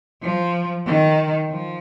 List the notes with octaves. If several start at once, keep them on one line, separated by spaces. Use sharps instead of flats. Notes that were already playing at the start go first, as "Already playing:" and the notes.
F3
D#3
F3